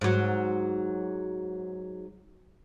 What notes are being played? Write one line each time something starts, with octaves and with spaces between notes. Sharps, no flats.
G#2 F#3